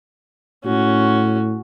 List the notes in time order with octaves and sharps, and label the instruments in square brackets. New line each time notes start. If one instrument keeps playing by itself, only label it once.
[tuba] A2 [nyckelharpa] C#4 F#4